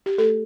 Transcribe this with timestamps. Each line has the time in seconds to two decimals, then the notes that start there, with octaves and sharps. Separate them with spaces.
0.06 G4
0.18 A3 A4